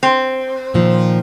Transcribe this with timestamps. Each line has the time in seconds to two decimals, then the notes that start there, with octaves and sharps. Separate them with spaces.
0.03 C4
0.74 A#2 D#3 F3